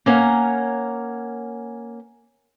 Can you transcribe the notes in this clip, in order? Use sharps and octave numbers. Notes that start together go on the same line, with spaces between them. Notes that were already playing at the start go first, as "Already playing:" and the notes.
A#3 C#4 A#4 F#5